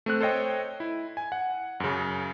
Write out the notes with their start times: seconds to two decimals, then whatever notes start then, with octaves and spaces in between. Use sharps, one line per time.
0.06 A3 C4 F#6
0.20 A4 C5 C#5 D#5 G5
0.80 E4
1.17 G#5
1.32 F#5
1.80 F#2 C#3